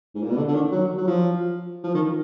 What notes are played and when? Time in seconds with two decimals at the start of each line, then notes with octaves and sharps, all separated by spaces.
0.15 G#2
0.22 A#2
0.30 B2
0.37 D3
0.48 D3
0.54 D#3
0.71 F#3
0.97 F#3
1.07 F3
1.83 F3
1.94 D#3